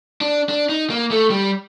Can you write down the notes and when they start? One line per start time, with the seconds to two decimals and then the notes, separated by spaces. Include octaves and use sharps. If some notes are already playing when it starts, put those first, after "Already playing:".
0.21 D4
0.49 D4
0.69 D#4
0.90 A#3
1.11 A3
1.30 G3